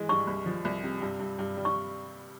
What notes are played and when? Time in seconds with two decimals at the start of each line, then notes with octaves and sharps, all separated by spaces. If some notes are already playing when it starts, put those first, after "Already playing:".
Already playing: E3 G#3
0.09 G2 C#6
0.27 C2
0.46 F3
0.65 C2
0.83 C3
1.01 G2
1.19 G2
1.39 G2
1.57 G3
1.65 C#6